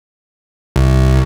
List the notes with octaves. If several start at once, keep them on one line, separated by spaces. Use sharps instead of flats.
C2